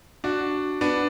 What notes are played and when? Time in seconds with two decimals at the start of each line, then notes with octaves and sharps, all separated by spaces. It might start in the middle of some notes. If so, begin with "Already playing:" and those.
0.24 D4 F#4
0.81 B3 D4